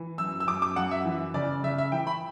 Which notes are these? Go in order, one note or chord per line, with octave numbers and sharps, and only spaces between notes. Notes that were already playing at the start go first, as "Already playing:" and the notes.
Already playing: E3
F#2 E6
E6
F#2 D6
D6
F#2 F#5
E5
E3
C#3 D5
C#3 E5
E5
E3 G5
B5